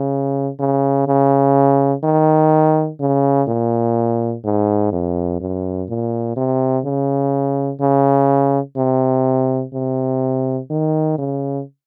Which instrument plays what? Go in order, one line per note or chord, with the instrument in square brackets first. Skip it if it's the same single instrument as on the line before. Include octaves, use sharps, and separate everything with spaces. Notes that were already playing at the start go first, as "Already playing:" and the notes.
Already playing: [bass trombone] C#3
C#3
C#3
D#3
C#3
A#2
G#2
F2
F#2
A#2
C3
C#3
C#3
C3
C3
D#3
C#3